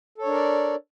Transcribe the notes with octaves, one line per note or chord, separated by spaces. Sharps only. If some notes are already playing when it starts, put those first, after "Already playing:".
D4 A4 A#4 C#5 D5